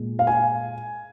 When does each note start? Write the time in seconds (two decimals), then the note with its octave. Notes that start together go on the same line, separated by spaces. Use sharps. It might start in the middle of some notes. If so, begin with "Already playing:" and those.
Already playing: A#2 G#3
0.19 F5
0.27 G#5